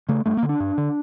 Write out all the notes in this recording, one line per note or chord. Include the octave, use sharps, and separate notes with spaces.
C#3 A3
G2 A3
A#3
D3
D4
G2
D3